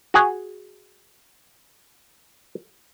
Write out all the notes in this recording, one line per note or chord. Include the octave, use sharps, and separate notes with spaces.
F#4 G#4